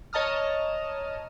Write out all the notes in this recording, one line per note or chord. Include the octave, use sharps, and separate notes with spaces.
C#5 D#5 A5 A#5 D#6 F6